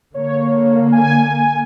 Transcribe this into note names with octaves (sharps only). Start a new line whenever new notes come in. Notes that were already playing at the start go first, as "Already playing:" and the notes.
D3 A#3 C#5
G#5